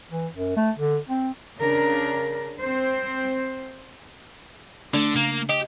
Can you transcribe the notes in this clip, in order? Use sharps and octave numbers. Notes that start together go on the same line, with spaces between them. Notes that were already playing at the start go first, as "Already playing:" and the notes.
E3
F#2
A3
D3
C4
C#3 D4 A#4
C4 C5
D3 A3 D4
C#3 A#3
G4 D#5